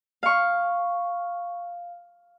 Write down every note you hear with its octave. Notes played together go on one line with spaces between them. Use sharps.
F5 C#6